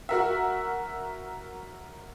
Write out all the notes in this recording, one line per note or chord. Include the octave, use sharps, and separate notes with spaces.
F#4 A#4 E5